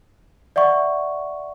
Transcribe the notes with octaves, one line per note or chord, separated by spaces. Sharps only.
D5 E5 F#5 C#6